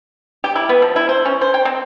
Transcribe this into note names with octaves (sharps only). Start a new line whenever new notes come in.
G4
E4
B3
F3
E4
C5
C#4
C5
G5
C4